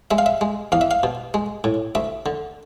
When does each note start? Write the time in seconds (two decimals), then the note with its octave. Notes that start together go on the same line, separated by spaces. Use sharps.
0.11 G#3 E5
0.18 F5
0.26 E5
0.41 G#3
0.72 E2 F5
0.81 E5
0.91 F5
1.03 B2
1.34 G#3
1.64 A2
1.95 D2 E5
2.26 D3